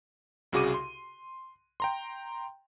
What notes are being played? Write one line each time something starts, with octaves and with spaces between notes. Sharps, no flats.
C2 C#3 F#4 G#4 D6 D#7
C6
G5 A#5 C6